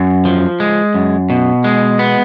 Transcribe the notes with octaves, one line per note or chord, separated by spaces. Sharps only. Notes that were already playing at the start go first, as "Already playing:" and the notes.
Already playing: F#2
F3
G#3
F#2
B2
G#3
B3